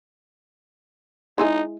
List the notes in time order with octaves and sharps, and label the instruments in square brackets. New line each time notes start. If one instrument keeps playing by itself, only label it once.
[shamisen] G#3 E4 G#4 [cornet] D#4